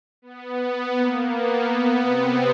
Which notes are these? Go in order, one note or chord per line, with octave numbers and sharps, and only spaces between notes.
B3
A#3
B3
C3 C4